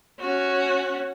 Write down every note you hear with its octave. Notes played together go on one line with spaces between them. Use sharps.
C#4 F#4